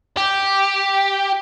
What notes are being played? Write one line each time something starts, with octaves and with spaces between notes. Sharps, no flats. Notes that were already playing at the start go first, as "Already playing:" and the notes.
G4